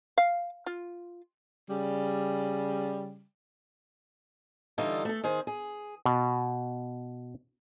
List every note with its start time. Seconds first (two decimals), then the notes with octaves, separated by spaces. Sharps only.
0.18 F5
0.66 F4
1.69 C#3 G3
4.78 D3 E3 G3 D#4 F4 A4
5.05 A3 A4
5.24 D#3 G#4 C5
5.47 G#4
6.05 B2